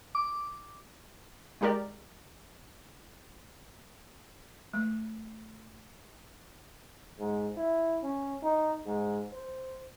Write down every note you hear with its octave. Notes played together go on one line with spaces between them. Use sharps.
D6
G#3 D#4 G4 A#4 D5
A3
G#2
E4
C#4
D#4
G#2
C5